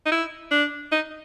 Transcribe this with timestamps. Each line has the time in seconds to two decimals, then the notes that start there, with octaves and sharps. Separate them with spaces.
0.06 D#4
0.12 E4
0.51 D4
0.92 D#4